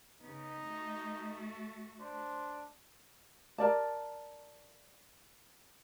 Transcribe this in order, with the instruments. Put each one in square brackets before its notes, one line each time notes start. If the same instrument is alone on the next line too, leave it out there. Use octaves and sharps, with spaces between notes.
[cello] C#3 B3 [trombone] D#4
[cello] A3 F#4
[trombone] D4 [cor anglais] C5
[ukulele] A#4 D5 A5